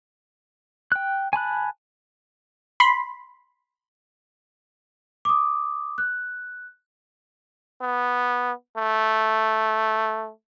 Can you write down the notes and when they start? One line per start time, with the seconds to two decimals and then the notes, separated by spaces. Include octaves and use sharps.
0.92 G5 F#6
1.33 G#5 A5 B5 F#6
2.80 B5 C6
5.25 D6 D#6
5.98 F#6
7.81 B3
8.77 A3